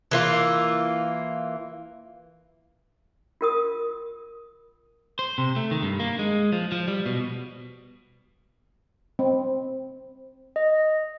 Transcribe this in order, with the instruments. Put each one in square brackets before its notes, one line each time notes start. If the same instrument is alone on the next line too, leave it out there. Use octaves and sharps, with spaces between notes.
[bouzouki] E3 A#3 F4
[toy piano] F4 A#4 D#6
[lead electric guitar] C5
C3
A3
D#3
G2
A#3
G#3
F3
F3
G3
B2
[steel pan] C4
[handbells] D#5